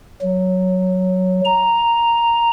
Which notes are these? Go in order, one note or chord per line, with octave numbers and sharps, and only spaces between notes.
F#3
A#5